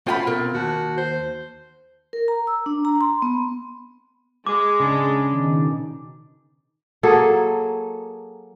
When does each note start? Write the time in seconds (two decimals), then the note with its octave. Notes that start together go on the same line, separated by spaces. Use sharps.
0.07 A3 C#4 F4 F#4 C5 G5 B5
0.27 B2 C4 A#4
0.54 D#2 F#4 A5
0.98 C5
2.13 A#4
2.28 A#5
2.47 E6
2.66 D4
2.85 A#5
3.01 C6
3.22 B3
4.47 G#3 D6
4.80 C#3 D4
5.32 B2 D#3 D#4
7.03 F#3 A#3 G#4 A4